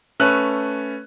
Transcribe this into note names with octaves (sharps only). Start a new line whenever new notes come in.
A3 C#4 B4 F#6